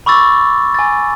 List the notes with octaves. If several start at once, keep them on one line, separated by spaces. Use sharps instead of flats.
B5 C#6 D6 E6 A6
G#5 A6